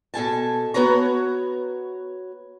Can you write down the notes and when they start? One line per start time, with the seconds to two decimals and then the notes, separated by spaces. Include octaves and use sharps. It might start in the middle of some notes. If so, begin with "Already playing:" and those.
0.14 B2 A4 G#5 A5
0.74 B3 F#4 B4 C#5 A#5